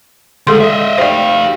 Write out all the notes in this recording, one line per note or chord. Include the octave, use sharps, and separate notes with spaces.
D2 G#3 G#4 A4 C6
D#5 E5
G4 C5 D5 F5